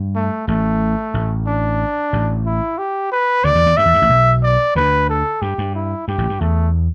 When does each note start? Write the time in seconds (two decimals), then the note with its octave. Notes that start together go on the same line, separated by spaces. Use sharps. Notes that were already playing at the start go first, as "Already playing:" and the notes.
Already playing: G2
0.15 A3
0.48 A1 A2 A3
1.14 A1 A2
1.47 D4
2.13 A1 A2
2.46 E4
2.78 G4
3.12 B4
3.44 D2 D3 D5
3.55 E2 E3
3.66 E2 E3
3.77 G2 E5
3.86 E2
3.94 G2
4.02 A1 A2
4.10 B1 B2
4.43 D5
4.75 D2 D3 B4
5.09 A4
5.42 G2 G4
5.58 G2
5.75 E4
6.08 G2 G4
6.18 A1 A2
6.29 G2
6.40 E2 A3